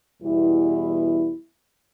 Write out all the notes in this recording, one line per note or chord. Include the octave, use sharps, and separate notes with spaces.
E2 B2 E3 G3 E4